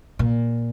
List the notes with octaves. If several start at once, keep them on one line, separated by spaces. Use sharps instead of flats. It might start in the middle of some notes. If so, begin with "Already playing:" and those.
A#2